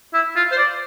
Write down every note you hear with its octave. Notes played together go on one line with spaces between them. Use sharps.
E4
F4
C5
D5